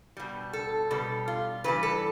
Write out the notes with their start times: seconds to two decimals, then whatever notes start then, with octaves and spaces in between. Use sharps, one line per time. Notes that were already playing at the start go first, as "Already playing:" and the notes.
0.17 B2 G3
0.53 A4
0.91 B2 G3 A4
1.28 F4
1.64 G2 E3 G3 B4
1.83 A4